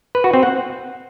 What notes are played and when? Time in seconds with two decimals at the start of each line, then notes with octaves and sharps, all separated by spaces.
0.15 B4
0.24 F#4
0.33 C4
0.43 F#5